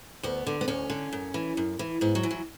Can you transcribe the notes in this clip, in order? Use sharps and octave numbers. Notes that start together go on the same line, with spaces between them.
D2 B3
D3
B3
D2 C#4
D3
F#2
E3
F#2
E3
G#2 B3
F#3
E3
F#3